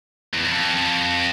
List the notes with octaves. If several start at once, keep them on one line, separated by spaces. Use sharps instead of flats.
E2
F2